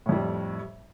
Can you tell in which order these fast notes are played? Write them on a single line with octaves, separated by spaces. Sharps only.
A2 F2 G3